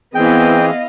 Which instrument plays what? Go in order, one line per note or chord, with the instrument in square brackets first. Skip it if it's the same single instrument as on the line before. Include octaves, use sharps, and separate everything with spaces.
[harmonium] E3 C4 G#4 [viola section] B3 E4 [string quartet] D#5 F5 [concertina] G5